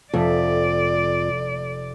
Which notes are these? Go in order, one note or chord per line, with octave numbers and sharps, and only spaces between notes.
F1 F2 A3 D5 E5